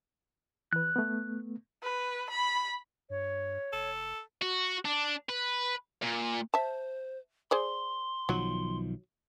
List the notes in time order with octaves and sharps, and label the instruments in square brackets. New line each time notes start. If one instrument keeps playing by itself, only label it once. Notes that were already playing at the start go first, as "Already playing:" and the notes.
[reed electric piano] E3 B4 [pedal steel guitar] F#6
[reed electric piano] A3 B3
[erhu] B4
B5
[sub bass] G2 [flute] C#5
[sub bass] F1 [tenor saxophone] A4
[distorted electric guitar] F#4
D4
B4
A#2
[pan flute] C5 [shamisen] E5 A5
[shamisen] G#4 C5 D5 [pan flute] C6
[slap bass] B1 D#3 F3 [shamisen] F#3